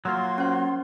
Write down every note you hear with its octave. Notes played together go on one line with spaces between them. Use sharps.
F#3 A#3 F4 F#4 C6
C#4 C5